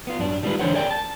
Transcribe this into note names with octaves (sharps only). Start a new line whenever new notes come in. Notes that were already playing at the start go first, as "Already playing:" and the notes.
B3 F4
F#2 D4
D#3 G3 G#3 A#3 F4 B4
D3 E3 D4 C5 C#5 F#5
G#4 A#4 D5 G5
A5